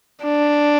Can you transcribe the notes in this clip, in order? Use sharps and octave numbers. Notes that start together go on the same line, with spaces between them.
D4